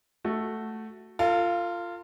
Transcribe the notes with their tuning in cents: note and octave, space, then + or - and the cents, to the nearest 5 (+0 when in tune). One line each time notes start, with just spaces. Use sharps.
A3 +0 F#4 +0
F4 -10 A4 +45